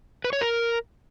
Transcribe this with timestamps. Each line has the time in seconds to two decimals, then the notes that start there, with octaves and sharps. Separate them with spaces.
0.24 B4
0.33 C#5
0.41 A#4